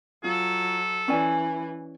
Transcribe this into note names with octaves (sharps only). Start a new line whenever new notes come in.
F#3 F4 A4
E3 C#4 E4 D5 G#5